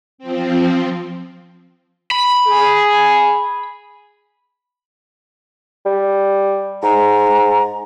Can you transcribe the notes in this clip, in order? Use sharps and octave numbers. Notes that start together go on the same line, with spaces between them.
F3 C4
B5
G#4
G3
G#2 A#5